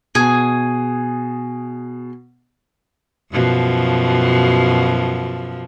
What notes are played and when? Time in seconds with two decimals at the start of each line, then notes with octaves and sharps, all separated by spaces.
0.15 B2 G#4 G#5
3.32 F#2 B2 F3